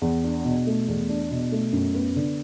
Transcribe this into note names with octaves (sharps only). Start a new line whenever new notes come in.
E2
D4
B2
A3
E2
D4
B2
A3
F#2
B3
D3